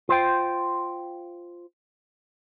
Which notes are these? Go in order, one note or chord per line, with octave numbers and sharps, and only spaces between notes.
F4 C5 G5